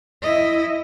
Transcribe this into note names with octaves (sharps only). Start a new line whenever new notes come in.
E4 D#5